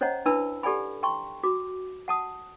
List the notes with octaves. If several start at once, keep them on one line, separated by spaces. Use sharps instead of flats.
C#4 C5 C#5 D#5 F#5 A#5
D4 E4 B4 A5 B5 E6
G4 A4 D5 F#5 G#5 B5
G5 A#5 C6 C#6
F#4 D6
F#5 A5 D#6